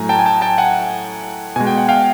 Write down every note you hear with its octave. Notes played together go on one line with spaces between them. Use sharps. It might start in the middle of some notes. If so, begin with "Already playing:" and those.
Already playing: A2 F#3 A3 G#5 A#5
G5 A5
G#5
G5 A5
G5 A5
F#5 G#5
B2 G#3 G#5
G5
F#5
F5 G5